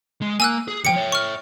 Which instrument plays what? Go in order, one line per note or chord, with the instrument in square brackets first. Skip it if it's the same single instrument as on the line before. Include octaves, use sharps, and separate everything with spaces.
[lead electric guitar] G#3
[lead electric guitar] A#3 [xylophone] G#5 E6 F#6
[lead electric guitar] G#4
[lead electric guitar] D#2 F3 [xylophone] G5 C#7
[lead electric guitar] C#5 E5
[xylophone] C#6 F6